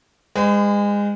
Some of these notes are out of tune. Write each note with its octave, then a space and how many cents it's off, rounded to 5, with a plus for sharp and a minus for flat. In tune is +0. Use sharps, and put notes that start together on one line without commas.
G#3 -25 B4 +45